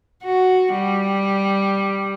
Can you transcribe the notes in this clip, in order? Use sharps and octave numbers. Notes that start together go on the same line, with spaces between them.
F#4
G3